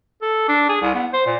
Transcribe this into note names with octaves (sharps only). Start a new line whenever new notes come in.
A4
D4
G#4
C2
B3
C5
A#2